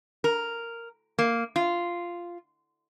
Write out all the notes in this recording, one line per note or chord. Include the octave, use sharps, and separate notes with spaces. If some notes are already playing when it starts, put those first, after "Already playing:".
A#4
A#3
F4